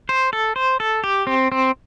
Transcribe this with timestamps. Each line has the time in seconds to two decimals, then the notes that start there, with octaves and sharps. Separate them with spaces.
0.09 C5
0.33 A4
0.56 C5
0.80 A4
1.04 G4
1.27 C4
1.52 C4